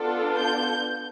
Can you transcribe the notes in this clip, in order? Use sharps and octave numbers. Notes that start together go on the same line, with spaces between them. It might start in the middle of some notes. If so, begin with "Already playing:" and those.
Already playing: B3 D4 F4 A4
G6